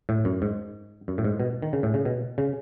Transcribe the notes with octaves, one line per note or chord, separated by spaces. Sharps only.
A2
F#2
G#2
F#2
A2
G#2
B2
D#3
C#3
A2
C#3
B2
C#3